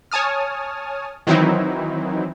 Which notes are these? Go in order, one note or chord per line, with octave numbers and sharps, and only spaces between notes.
C#5 G#5 A5 D#6 F6
D#3 E3 F#3 C4 D#4 E4